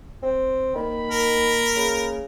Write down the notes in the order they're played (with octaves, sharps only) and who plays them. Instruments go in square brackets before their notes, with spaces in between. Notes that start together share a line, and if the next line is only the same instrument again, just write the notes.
[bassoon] C4
[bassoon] D#3 [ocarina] A#3 [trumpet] B5
[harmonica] A#4
[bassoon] C#3